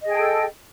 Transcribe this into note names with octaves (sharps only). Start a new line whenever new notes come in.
G#4 A4 D#5 G5